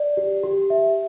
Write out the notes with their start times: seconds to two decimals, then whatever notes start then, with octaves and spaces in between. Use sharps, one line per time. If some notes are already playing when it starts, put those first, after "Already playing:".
Already playing: D5
0.17 G4
0.43 G4
0.70 E5